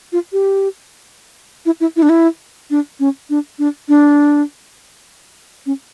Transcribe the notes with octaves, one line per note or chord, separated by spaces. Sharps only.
F4
G4
E4
E4
E4
D4
E4
D4
C#4
D4
D4
D4
C#4